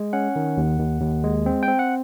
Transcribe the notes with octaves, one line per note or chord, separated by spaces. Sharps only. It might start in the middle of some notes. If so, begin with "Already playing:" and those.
Already playing: G#3
C#4 F#5
D#3
D#2
D#2
D#2
G#3
C4
G5
C4
F#5